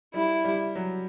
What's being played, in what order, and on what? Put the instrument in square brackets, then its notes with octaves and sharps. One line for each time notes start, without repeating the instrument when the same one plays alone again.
[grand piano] G3 [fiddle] E4
[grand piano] G3
F#3